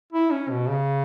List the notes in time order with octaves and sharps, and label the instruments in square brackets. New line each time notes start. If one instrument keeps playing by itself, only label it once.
[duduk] E4
C#4
B2
C#3